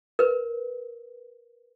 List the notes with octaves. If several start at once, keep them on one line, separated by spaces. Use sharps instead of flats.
A#4 B4